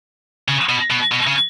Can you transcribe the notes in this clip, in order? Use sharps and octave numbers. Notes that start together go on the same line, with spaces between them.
C#3
B2
B2
B2
C#3